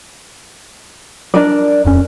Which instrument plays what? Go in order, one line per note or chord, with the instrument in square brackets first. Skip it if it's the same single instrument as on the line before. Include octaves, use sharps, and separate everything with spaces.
[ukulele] D4 A#4 D5
[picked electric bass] D#1 F2 C#4